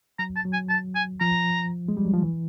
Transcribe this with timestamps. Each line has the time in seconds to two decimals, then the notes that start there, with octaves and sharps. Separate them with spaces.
0.19 F#3 A#5
0.36 A5
0.45 F#3
0.53 G#5
0.69 A5
0.95 G#5
1.20 F3 A#5
1.88 G#3
1.97 G3
2.05 F#3
2.13 F3
2.22 E3